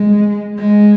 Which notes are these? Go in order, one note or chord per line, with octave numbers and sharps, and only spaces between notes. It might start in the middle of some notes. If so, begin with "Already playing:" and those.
Already playing: G#3
G#3